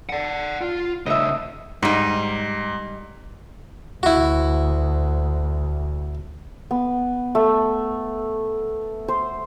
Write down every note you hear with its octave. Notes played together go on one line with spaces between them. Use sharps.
D5 F#5
F4
C#3 A3 D#5 E5
G#2 G3 D#4
D2 E4 F#4
B3
A3
C5